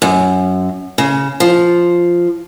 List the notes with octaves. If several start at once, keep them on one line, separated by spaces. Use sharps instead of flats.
F#2
C#3
F3